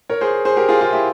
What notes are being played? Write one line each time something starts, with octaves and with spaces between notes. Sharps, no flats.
A#4 C#5
G#4 C5
G#4 C5
G4 A#4
F4 G#4
F4 G#4
E4 G4